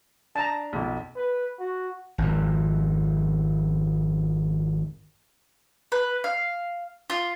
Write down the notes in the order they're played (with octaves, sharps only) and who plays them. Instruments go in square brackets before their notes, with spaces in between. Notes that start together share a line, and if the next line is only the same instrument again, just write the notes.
[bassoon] D4 [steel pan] A5 A#5
[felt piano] B1 F2
[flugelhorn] B4
F#4
[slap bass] G#1 F2
[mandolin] B4
F5
F4